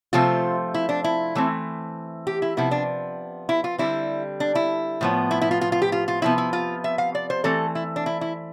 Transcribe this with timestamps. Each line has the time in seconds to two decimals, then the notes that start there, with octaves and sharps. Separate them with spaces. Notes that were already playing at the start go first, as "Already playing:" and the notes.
0.13 C3 F3 A3 C4 F4
0.74 E4
0.89 D4
1.04 E4
1.35 E3 A3 C4
2.27 G4
2.42 E4
2.57 C3 F3 B3 E4
2.71 D4
3.49 E4
3.64 F4
3.78 D3 G3 C4 E4
4.40 D4
4.55 E4
5.01 A2 F3 B3
5.31 E4
5.41 E4
5.51 F4
5.61 F4
5.72 F4
5.82 G4
5.92 F4
6.08 F4
6.22 C3 F3 B3 E4
6.38 E4
6.53 F4
6.84 E5
6.98 F5
7.15 D5
7.30 C5
7.44 E3 A3 C4 A4
7.75 E4
7.96 D4
8.06 E4
8.21 E4